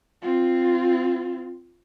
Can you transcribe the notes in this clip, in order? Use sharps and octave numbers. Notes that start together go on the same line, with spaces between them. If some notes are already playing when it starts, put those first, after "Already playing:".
C4 F4